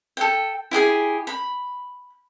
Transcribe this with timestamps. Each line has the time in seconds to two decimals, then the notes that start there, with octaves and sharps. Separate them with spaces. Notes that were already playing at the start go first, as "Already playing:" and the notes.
0.17 A4 G5
0.71 E4 G4 G#4 G#5
1.27 B5